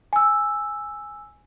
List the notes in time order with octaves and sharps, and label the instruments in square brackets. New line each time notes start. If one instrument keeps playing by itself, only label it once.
[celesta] G#5 E6